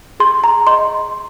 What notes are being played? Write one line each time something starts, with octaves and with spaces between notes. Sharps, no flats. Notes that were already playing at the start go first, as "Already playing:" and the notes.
G#4 C6
A#5
D#5 C6